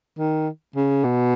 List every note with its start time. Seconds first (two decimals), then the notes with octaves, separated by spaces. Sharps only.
0.18 D#3
0.76 C#3
1.04 B2